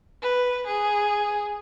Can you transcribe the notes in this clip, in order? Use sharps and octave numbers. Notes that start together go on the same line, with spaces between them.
B4
G#4